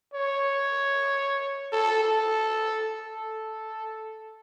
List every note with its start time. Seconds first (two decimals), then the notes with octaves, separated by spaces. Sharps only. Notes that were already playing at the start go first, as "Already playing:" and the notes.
0.14 C#5
1.72 A4
2.03 A4
3.00 A4